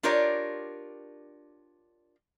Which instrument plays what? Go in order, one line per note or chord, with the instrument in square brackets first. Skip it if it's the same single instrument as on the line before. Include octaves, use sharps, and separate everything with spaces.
[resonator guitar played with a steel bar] D4 F4 G4 A#4 C#5 D5